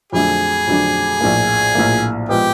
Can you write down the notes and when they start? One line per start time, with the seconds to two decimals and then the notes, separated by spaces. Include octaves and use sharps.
0.13 F2 D3 F#3 A3 D4 G#4
0.67 F2 D3 F#3 A3 D4
1.21 A#1 A2 F3 A#3
1.75 A#1 A2 F3 A#3
2.29 A#2 F3 G#3 B3 G4